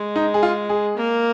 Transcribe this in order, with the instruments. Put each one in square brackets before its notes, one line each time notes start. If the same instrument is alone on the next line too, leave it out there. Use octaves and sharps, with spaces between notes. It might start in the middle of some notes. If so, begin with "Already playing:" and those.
Already playing: [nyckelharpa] G#3
[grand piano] D#4
G#4
F4
G#4
[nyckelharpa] A#3